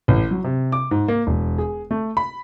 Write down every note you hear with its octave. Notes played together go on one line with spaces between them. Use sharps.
A1
F#3
C3
D6
G#2
A#3
E1
G#4
A3
B5